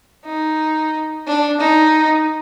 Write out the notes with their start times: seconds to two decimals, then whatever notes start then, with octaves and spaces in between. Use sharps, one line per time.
0.25 D#4
1.27 D4
1.60 D#4